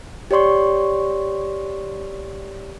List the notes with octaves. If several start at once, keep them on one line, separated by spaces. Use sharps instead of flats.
G4 C#5 D5 C6 C#6